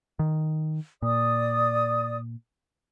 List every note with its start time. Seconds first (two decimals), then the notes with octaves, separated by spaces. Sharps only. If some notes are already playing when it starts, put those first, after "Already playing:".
0.19 D#3
1.02 A#2 D5 D#6